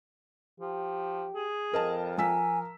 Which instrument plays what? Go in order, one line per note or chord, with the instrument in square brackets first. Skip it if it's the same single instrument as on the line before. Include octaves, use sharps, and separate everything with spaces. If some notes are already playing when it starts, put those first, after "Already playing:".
[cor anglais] F3 [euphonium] G4
[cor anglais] G#4
[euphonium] F2 [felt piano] A#4 D#5 A5
[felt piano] F3 E6 B6 [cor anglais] A#4 [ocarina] G#5